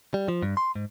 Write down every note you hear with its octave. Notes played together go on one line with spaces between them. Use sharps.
G3
F3
G2
C6
G#2